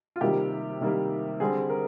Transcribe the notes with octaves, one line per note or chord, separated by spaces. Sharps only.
F4
C3 D#3 G3 A#3 G4
C3 D#3 G3 A#3
D3 G3 C4 G#4
A#4